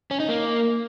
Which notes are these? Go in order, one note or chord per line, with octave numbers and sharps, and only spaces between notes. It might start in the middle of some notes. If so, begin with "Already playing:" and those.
C#4
D#4
A#3